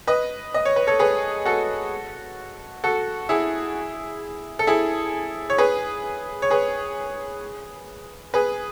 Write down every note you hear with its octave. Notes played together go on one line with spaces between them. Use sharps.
B4 D#5
D#5
C#5
B4
A4 C#5
G#4 B4
F#4 A4
F#4 A4
E4 G#4
A4
E4 G#4
C#5
G#4 B4
C#5
G#4 B4
G#4 B4